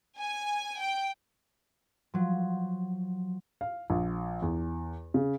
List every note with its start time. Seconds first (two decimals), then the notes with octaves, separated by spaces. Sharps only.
0.20 G#5
0.82 G5
2.14 F3 F#3
3.61 F5
3.90 A#1
4.42 E2
5.14 C#3